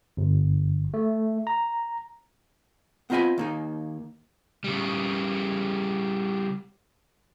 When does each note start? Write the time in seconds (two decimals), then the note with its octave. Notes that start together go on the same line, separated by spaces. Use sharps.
0.17 G1
0.94 A3
1.47 A#5
3.10 B3 C4 F4 D#5 G#5 B5
3.38 D#2 A#3 D#4
4.64 C#3 G3